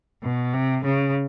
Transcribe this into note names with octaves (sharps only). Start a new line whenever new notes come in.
B2
C3
C#3